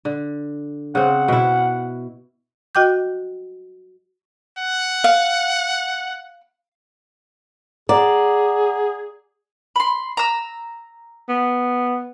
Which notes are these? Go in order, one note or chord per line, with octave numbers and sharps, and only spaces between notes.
D3
C#3 C4 F#5
B2 E4
F#4 D#5 G5 D6 G6
F#5
F5
G#4 D5 F#5 A#5
B5 C6
A#5 E6
B3